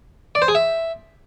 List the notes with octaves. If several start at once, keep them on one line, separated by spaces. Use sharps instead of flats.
D5
C5
G#4
E5